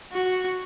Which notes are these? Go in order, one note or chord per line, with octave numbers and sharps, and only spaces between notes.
F#4